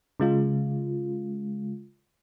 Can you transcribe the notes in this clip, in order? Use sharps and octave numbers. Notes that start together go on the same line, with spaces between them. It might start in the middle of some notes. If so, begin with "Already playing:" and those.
C#3 G#3 F4